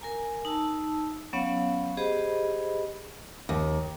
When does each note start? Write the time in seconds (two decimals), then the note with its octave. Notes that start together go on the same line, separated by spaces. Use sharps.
0.01 A#4 G#5 A#5
0.45 D#4 A5 E6
1.33 F#3 B3 C#4 C#5 F5 F#5
1.97 G4 G#4 C5 D#5 B5
3.49 D#2